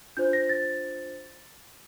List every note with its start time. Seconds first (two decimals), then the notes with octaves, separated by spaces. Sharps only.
0.17 D4 F4 C5 G6
0.33 A#6
0.49 A6